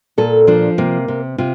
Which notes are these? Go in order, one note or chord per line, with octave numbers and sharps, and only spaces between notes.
A#2 A4
F3 D4
C3 A#3
C3
C3 F4